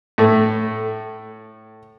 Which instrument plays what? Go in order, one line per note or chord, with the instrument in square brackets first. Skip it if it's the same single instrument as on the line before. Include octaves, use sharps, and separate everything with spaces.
[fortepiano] A2 A3